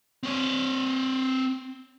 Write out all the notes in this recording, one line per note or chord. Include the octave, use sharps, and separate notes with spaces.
C4 C#5